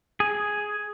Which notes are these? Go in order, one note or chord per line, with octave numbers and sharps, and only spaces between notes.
G#4